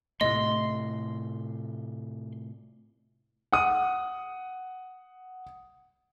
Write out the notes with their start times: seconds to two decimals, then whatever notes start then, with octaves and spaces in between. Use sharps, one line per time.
0.21 A2 C3 A3 D#5 C6
3.53 F#5 D#6